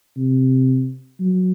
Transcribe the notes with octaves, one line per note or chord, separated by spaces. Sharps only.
C3
F#3